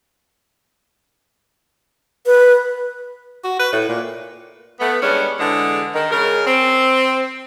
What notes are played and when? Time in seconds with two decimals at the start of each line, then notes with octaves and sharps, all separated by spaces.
2.26 B4
3.44 F#4
3.59 B4
3.73 A2
3.89 A#2
4.80 A3 B3
5.02 G3 G#3 B3 C#4 D4
5.39 D3 E3 G#3
5.94 D#3
6.12 C#3 G#3 A#4
6.47 C4